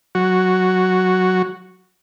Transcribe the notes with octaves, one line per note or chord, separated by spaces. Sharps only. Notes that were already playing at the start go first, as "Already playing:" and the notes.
F#3 F#4